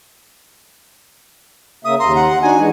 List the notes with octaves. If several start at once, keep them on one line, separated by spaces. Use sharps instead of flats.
C#3 A#3 E5 D#6
D#2 A#5 C6
F#5
D4 D#4 F#4 G#5
E3 G#3 D#4